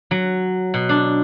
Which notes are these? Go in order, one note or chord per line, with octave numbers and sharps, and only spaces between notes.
F#3
B2
D4